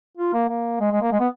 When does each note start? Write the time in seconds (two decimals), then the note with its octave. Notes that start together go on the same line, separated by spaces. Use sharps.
0.17 F4
0.33 A#3
0.49 A#3
0.80 G#3
0.91 G#3
1.02 A#3
1.12 G#3
1.20 B3